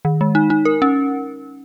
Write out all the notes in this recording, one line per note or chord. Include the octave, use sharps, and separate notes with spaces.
D#3
G#3
D#4
D#4
A#4
C#4